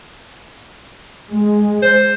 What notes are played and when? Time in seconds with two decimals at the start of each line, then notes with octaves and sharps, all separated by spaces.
1.29 G#3
1.82 C5